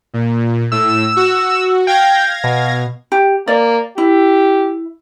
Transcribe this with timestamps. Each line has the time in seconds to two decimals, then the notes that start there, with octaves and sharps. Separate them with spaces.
0.14 A#2
0.72 A2 E6
1.16 F#4
1.87 F5 G5 G#6 A#6
2.44 B2
3.12 G4
3.48 A#3 D5
3.98 E4 G4